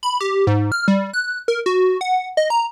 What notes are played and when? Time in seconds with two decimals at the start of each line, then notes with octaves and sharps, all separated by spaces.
0.03 B5
0.20 G4
0.47 G#2
0.72 F6
0.88 G3
1.13 F#6
1.48 A#4
1.66 F#4
2.01 F#5
2.37 D#5
2.50 A#5